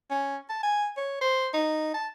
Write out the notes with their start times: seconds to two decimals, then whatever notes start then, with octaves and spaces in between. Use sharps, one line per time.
0.10 C#4
0.50 A5
0.63 G#5
0.97 C#5
1.21 C5
1.54 D#4
1.94 A5